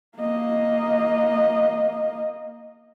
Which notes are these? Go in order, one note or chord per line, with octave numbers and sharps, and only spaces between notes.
A#3 D#5